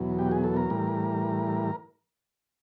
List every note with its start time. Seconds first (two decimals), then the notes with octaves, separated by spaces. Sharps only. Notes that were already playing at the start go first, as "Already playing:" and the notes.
Already playing: E2 B2 F#3
0.19 G4
0.31 G#4
0.44 A4
0.56 A#4
0.70 A2 E3 G3